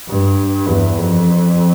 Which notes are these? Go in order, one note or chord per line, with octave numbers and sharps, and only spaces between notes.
G2
E2
F2